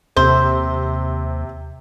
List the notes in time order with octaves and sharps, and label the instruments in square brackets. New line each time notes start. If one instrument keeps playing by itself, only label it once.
[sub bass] D#2 [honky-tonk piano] C3 [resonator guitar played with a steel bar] C5